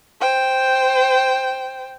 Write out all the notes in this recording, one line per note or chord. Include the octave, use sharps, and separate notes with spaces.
C5 G5